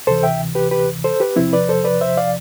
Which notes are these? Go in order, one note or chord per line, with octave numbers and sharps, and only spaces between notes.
D2 C3 E3 A4 C5
E5 G5
G4 B4
G4 B4
A4 C5
G4 B4
E2 C3 F3 C4 E4
B4 D5
A4 C5
B4 D5
C5 E5
D5 F5